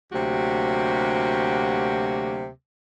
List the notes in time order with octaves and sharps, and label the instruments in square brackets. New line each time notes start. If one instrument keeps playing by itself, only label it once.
[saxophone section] D2 C3 F#3 A#3 F#4 G4